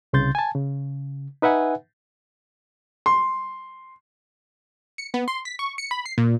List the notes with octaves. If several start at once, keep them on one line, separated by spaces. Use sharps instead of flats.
C2 C#3 C6 G6 A6
G#5 A5
C#3
D#4 B4 E5 F#5 G#5
C6
C#7
B3
C6
B6
C#6
C#7
B5
C7
A#2